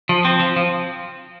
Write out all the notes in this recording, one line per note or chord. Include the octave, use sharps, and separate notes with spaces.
F3
C4
F3
F3